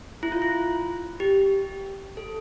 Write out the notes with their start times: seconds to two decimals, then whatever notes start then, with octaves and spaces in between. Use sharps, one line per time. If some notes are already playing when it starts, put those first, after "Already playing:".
0.23 E4
0.32 F4
0.42 E4
1.20 G4
2.17 A4